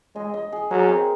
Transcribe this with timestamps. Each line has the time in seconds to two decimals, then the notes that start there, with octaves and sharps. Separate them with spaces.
0.15 G#3 D#5
0.34 D#5
0.52 G#4
0.70 F#3 A#4
0.89 C4